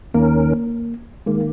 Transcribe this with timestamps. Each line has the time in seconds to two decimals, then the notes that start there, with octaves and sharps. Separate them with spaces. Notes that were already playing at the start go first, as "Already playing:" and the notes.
0.14 D#2 D#3 A#3 C#4 A#4
1.26 D#3 G#3 A#3